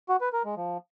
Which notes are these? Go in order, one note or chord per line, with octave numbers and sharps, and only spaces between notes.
F#4
B4
A#4
G#3
F3